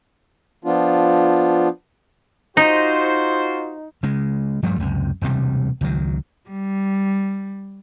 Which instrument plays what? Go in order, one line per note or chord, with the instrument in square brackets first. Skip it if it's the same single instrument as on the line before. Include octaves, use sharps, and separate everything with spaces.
[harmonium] F3 B3 D4 F4
[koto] D#4 [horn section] F4 F#4 C5 [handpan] D#5
[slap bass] C#3 G#3
G2 F3 G3 A3
C#2 F#2 C3
E1 D2 C3 G3
C#2 D#3 F#3
[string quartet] G3